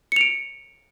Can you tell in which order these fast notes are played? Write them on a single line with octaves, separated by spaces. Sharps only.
C#7 F7 D7